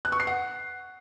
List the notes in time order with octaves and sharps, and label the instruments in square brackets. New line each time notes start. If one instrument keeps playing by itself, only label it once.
[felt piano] F#6
C#6
C7
F#5